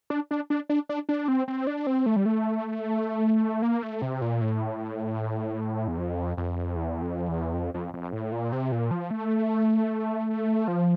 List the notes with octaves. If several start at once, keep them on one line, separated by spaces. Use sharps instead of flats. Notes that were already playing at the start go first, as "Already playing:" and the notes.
D4
D4
D4
D4
D4
D4
C4
C4
D4
C4
A3
G3
A3
A#3
A3
C3
A#2
A2
E2
F2
F2
E2
F2
E2
F2
F2
F2
A2
A#2
C3
A#2
F3
A3
F3